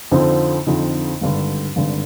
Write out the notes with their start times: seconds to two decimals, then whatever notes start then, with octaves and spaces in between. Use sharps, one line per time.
0.12 F2 D3 F3 C4 D#4
0.67 F2 D3 F3 C4 D#4
1.21 G#1 G2 D3
1.76 G#1 G2 D3